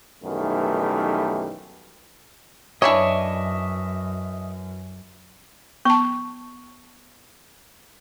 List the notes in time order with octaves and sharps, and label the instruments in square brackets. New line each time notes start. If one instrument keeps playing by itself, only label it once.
[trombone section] B1 F#2 D#3 E3 G3 A3
[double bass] F#2 [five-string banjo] E3 D4 C#5 [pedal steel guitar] D#5 E5 C#6
[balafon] B3 A5 [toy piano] C#6